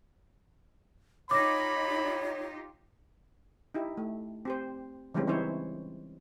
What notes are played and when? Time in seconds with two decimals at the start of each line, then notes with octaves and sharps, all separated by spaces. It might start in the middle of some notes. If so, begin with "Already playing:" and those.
1.31 D#4 F4 G4 C#5 B5 D6 A#6
3.74 D#4 E4 G4
3.97 A3
4.45 C4 G4 C5
5.14 C#3 E3 G3 G#3 C4 C#4
5.27 E3 C4 D#4 E4 C5 C#5